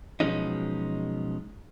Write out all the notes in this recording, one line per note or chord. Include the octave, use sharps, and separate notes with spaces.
B2 F3 F#3 G#3 C#4 D#4